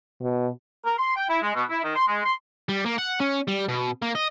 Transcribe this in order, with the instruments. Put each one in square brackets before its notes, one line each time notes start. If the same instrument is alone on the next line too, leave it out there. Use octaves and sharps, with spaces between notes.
[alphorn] B2
[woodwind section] A#4
C6
G5
E4
G#3
B2
E4
D#3
C6
G#3
C6
[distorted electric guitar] G3
A#3
F#5
C#4
G3
B2
A#3
D#5